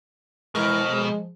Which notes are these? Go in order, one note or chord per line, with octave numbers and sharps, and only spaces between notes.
F2 B2 E3 G#3 A#4
F3 G#3